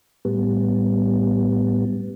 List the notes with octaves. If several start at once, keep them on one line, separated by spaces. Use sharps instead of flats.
A2 G3 B3